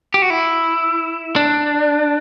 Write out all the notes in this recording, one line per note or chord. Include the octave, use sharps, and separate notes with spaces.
G4
F#4
E4
D4